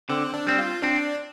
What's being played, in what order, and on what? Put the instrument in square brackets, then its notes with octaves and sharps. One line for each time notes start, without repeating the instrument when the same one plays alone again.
[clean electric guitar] D3 [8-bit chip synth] C4
[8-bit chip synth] D4
[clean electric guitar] G3 C4
[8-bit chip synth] F4
[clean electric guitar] C4 [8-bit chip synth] D4